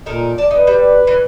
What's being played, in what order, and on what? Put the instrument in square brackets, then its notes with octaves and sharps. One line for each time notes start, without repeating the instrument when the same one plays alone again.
[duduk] A#2 [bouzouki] D#4 A4 A#4
[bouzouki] D5 A5
[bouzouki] D#4 [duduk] B4
[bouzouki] G3
E3